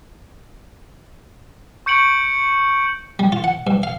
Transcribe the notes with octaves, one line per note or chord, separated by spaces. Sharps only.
C#6 G6 C#7 D7 F#7
G3
F4
F#5
G2
F5